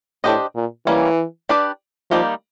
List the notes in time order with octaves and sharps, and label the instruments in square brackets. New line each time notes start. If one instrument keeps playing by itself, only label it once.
[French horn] A2 [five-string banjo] D4 G4 C5 D#5
[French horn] A#2
[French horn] E3 [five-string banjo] G3 A#3 C#4
[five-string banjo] D4 G4 B4 D5
[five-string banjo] D#3 G3 A#3 D#4 G4 [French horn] F3